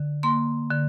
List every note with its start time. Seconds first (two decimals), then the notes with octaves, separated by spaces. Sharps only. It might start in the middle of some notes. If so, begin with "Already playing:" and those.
Already playing: D3
0.23 A#3 C6
0.71 D3